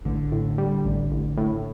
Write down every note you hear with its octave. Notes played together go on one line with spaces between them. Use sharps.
A1 D3
A2
G3
A1
A1
A2